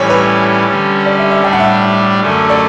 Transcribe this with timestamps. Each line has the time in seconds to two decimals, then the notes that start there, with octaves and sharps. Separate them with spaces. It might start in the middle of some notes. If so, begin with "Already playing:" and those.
Already playing: A2 E3 G3 C#4 C#5
0.10 B4
0.67 D3 G3 C#4
1.06 D5
1.19 E5
1.31 E5
1.44 A2 G3 D4 G5
1.53 F#5
1.60 E5
1.68 F#5
2.20 F#2 D3 A3 C#4
2.50 D5